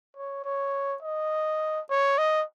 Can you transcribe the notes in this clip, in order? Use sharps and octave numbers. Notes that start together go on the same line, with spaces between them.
C#5
C#5
D#5
C#5
D#5